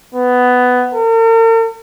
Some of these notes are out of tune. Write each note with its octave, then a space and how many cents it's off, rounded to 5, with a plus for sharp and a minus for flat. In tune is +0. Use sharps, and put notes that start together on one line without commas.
B3 +10
A#4 -45